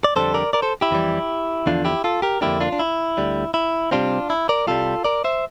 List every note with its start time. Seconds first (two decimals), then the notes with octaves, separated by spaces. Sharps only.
0.04 D5
0.16 F2 D3 G3 A4 C5
0.34 A#4 D5
0.53 A#4 D5
0.62 A4 C5
0.81 E4 G4
0.91 F2 E3 G3
1.66 E2 D3 F3 D4 F4
1.85 E4 G4
2.04 F4 A4
2.22 G4 A#4
2.41 F2 D3 G3 A#3 D4 E4 G4
2.60 D4 F4
2.72 D4
2.79 E4
3.17 D2 D3 G3
3.54 E4
3.91 C3 G3 C4 D4 F4
4.30 E4
4.49 A#4 D5
4.67 C2 C3 G3 F4 A4
5.05 A#4 D5
5.24 C5 E5